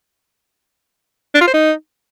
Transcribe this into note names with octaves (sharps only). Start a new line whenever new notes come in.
D4
F4
C5
D#4